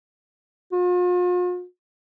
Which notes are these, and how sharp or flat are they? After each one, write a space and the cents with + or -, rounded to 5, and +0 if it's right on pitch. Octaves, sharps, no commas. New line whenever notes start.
F4 +45